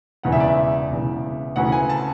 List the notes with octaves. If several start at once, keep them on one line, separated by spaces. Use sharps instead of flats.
E1 E2 C#3 E3 F#5
E5
D5
E5
E1 E2 C#3 E3
D2 C#3 E3 F#5
G#5
A5